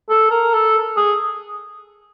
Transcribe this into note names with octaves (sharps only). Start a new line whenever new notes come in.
A4
A#4
A4
G#4